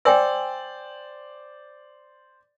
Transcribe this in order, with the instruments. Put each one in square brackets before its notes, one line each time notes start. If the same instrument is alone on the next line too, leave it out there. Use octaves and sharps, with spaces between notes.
[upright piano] C5 D5 [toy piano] G5 G#5 E6